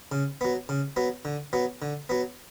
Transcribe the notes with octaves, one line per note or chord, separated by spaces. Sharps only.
C#3
F#3 B3
C#3
F#3 B3
D3
F#3 B3
D3
F#3 B3